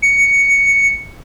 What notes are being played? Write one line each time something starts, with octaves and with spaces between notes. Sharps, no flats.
C#7